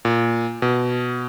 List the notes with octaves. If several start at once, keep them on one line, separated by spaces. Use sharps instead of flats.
A#2
B2